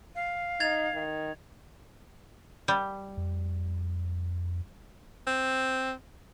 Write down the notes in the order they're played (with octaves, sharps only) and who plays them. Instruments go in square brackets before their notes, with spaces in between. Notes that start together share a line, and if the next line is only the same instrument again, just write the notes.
[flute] F5
[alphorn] D#4 [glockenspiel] G#6 A6 F7
[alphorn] D#3
[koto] G3
[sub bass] F2
[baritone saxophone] C4